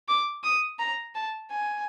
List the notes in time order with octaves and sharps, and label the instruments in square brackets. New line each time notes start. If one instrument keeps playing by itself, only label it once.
[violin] D6
D#6
A#5
A5
G#5